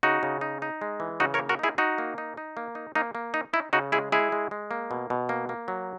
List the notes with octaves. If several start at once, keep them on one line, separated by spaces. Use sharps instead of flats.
C#3 D#4 F#4
C#3
D#4
D#4
G#3
E3
C#3 D#4 F#4
A#4 C#5
A#3
F#4 A#4
D#4 E4 G#4
D#4 F#4
A#3
D#4
D#4
A#3
D#4
A#3 D#4
A#3
D#4
D#4 E4
C#3 D#4 F#4
G#3 E4 G#4
G#3 E4 G#4
G#3
G#3
A#3
B2
B2
A#3
A#3
F#3